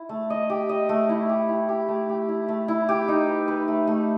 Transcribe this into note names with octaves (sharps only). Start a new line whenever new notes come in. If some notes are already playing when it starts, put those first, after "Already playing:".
Already playing: E4
A3
D#5
G4
D#5
A3
E4
G4
E4
G4
A3
G4
E4
A3
E4
G4
D#4
B4
B4
A3
A3